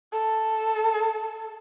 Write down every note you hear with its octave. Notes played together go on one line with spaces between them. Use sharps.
A4